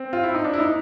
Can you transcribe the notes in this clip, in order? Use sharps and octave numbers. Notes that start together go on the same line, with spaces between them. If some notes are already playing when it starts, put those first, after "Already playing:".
Already playing: C4
F4
E4
D#4
D4
E4
D#4